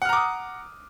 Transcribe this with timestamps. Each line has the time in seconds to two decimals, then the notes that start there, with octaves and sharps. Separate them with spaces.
0.02 F#5
0.05 F6
0.09 A#5
0.13 D6
0.16 D#6